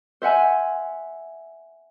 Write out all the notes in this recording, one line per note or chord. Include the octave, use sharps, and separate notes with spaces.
C5 E5 F#5 G#5